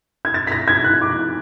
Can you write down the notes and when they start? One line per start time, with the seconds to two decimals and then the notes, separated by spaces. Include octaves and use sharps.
0.25 G#6
0.34 A6
0.47 B6
0.52 A#6
0.68 G#6
0.84 F#6
1.01 D6